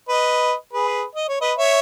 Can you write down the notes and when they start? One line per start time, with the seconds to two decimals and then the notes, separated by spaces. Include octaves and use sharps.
0.09 B4 D#5
0.73 G#4 B4
1.15 D#5
1.29 C#5
1.41 B4 D#5
1.58 C#5 E5